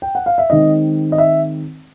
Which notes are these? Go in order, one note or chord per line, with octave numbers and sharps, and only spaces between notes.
G5
F#5
F5
E5
D#3 G#3 C4 D#4 D#5
D#5
E5